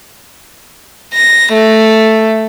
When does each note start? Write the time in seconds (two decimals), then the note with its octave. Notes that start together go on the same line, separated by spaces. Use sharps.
1.14 A#6
1.53 A3